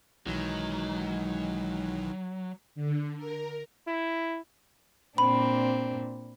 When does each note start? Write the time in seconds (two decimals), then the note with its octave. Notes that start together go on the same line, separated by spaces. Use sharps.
0.27 B1 D#3 E3 F#3 G#3
2.75 D3
3.17 A#4
3.87 E4
5.18 A#2 C4 D4 B5